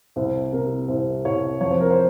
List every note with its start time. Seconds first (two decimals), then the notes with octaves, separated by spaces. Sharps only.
0.16 C2 C5
0.52 C3 A#4
0.88 C2 C5
1.25 C2 C#5
1.61 F2 C#5
1.71 C5
1.81 A#4
1.91 C5